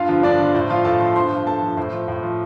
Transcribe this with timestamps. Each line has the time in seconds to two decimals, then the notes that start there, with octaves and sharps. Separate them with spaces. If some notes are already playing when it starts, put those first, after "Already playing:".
Already playing: G2 F4 F5
0.09 D3 F3
0.23 G2 D4 D5
0.39 D3 F3
0.54 A2 C5
0.70 F3 F4 F5
0.85 A2 A4 A5
1.00 F3 C5 C6
1.16 G2 C5 C6
1.31 F3
1.46 G2 A4 A5
1.62 F3
1.77 A2 C5
1.92 F3
2.08 A2
2.23 F3